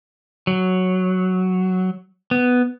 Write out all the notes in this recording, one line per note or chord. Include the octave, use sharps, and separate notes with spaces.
F#3
B3